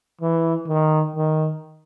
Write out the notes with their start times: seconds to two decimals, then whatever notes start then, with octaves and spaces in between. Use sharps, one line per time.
0.21 E3
0.68 D#3
1.16 D#3